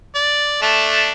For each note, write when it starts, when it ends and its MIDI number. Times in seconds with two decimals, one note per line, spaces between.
0.15 0.61 74
0.62 1.11 57
0.62 1.11 62